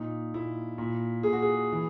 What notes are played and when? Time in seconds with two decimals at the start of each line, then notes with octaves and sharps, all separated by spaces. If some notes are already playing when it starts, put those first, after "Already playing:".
Already playing: A#2 D#4
0.34 A#2 E4
0.78 A#2
1.23 A#2 G#4
1.33 F#4
1.42 G#4
1.73 E3